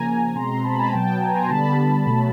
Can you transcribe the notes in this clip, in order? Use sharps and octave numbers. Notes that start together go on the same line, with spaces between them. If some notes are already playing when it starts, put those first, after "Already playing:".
Already playing: C#3 F3 A#3 G#5 A#5
B2 G#3 C4 A#5 C6
A5 B5
G#5 A#5
B2 F#3 B3 G5 A5
G#5 A#5
A#5 C6
D3 G3 B3 A5 B5
B2 F#3 A3